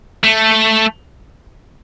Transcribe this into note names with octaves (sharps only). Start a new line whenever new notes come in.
A3